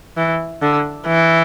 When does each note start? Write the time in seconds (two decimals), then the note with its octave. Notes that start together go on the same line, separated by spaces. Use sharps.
0.17 E3
0.62 D3
1.07 E3